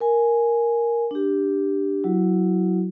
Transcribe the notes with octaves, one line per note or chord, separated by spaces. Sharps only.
A#4 G#5
D4 G4
F#3 E4 F#4